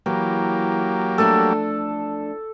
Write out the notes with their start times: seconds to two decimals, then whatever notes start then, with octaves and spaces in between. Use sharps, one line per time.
0.06 E3 F#3 A#3 G4
1.18 F3 A3 D4 A4